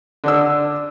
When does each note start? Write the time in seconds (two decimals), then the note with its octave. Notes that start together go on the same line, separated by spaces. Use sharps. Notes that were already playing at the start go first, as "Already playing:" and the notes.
0.24 D3 D4 E6